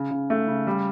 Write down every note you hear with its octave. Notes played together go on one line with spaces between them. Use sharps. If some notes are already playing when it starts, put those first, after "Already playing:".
Already playing: C#3
C#3
A3
C#3
G3